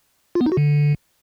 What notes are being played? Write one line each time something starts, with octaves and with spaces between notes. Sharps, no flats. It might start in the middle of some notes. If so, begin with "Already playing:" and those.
F4
B3
D#4
F#4
D3